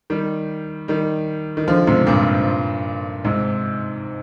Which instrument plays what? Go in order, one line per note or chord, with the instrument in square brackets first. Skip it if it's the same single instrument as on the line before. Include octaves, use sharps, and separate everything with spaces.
[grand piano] D#3 G3
D#3 G3
D#3
D3 F3
G#2 C3
G2 A#2
G#2 C3